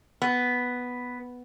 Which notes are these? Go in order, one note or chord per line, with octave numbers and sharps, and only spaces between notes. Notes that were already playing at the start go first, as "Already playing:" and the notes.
B3